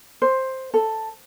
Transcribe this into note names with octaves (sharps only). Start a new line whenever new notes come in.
C5
A4